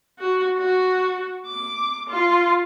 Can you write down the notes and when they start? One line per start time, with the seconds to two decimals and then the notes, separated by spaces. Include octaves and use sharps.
0.19 F#4
0.57 F#4
1.47 D6
2.10 F4